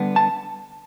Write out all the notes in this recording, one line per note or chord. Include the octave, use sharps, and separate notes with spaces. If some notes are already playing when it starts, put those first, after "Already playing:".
Already playing: D3 G3 B3 D4
A5